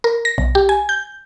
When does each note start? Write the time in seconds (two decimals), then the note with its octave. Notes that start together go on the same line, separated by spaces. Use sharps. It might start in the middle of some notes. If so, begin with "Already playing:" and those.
0.04 A#4
0.25 A#6
0.38 B1
0.55 G4
0.69 G#5
0.89 G6